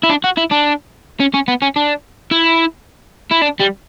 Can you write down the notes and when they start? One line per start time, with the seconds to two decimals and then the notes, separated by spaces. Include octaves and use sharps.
0.03 E4
0.10 D4
0.24 F#4
0.37 E4
0.51 D4
1.20 C#4
1.34 C#4
1.48 B3
1.62 C#4
1.76 D4
2.31 E4
3.31 E4
3.42 D4
3.60 G3